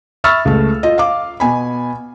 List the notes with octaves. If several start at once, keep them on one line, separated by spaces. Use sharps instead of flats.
E5 B5 C#6 E6 F6 A6
C#2 A3
F4 D#5
F5 D6
B2 G#5 B5